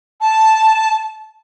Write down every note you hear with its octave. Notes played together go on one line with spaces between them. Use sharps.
A5